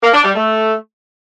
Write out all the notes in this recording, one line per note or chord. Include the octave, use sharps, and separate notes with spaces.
A#3
D4
G3
A3